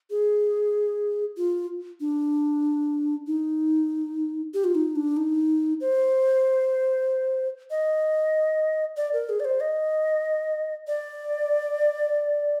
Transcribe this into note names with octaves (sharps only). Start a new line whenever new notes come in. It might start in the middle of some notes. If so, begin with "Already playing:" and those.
G#4
F4
D4
D#4
G4
F4
D#4
D4
D#4
C5
D#5
D5
A#4
G#4
D5
C5
D#5
D5